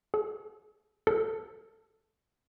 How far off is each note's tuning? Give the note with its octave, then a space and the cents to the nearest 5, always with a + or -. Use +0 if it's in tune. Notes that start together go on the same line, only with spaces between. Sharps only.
A4 -40
A4 +15